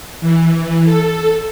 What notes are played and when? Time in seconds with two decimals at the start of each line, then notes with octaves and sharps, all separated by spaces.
0.21 E3
0.84 A4